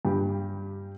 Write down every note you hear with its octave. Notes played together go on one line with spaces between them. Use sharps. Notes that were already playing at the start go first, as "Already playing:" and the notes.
G2 G4